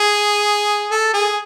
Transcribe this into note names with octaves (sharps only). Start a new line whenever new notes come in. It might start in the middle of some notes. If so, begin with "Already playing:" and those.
Already playing: G#4
A4
G#4